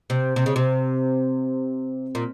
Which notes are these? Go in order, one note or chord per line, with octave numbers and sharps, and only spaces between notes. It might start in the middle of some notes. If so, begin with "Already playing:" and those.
C3
C3
C#3
C3
A#2